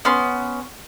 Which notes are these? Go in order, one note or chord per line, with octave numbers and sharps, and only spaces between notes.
B3 C#4 C6